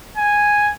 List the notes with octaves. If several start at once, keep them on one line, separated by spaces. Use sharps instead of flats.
G#5